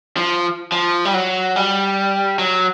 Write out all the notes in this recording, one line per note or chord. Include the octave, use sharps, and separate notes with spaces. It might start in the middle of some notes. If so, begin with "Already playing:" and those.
F3
F3
G3
F#3
G3
F#3